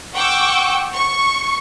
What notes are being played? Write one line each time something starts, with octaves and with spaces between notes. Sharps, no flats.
F#5 G5 C#6 D6 E6
C#6